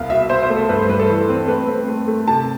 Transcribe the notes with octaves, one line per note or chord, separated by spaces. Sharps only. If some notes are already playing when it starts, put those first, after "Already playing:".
Already playing: C2 B3 F5
B2 E5
B2 C5
C5
A3
A4
G2 B4
C5
G3 B4
A4
E3
C4
A3 B4
C4
A3
A3
C3 A5